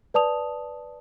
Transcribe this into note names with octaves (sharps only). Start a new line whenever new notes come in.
B4 D5 A5 D#6 F7